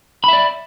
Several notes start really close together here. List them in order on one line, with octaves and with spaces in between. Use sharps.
B5 E5 D5